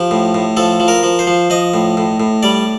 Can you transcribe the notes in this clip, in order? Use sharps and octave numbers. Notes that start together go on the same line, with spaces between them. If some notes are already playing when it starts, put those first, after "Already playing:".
Already playing: F3 G4
A2
A2
F3 A4
F3
A#4
F3
C5
F3
F3 D#5
A2
A2
A2
G3 D5